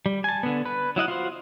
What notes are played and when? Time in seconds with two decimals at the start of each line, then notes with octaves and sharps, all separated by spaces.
0.06 G3
0.24 G#5 A5
0.43 D3 B3
0.66 B4
0.96 F#3 E4 D#5 F#5
1.08 F4 F#4 C5